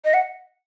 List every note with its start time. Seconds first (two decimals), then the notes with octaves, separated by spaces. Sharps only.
0.05 D#5
0.14 F#5